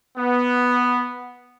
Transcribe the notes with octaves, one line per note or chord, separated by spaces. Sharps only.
B3